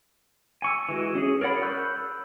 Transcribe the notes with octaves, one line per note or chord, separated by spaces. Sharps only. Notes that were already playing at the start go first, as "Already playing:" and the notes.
G#5 C#6 E6
E3 G#3 F#4
C#4 G#4
A#4 C#5 D5 F#5 B5
B5 C#6 E6 F#6 G6